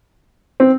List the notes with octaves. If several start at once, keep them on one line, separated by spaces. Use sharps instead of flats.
C4